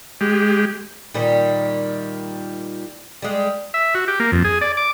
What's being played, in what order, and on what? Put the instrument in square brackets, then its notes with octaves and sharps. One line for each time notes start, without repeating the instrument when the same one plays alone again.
[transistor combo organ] G#3 G4
[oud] A#2 D#3 G3
G3 G#3
[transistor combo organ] E5
F#4
G4
A#3
F2
G#4
D5
D6